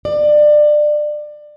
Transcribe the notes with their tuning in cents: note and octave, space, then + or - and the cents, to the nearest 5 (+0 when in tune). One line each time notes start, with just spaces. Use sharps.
D5 +25